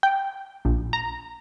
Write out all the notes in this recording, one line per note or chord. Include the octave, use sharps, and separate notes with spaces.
G5
A#1
A#5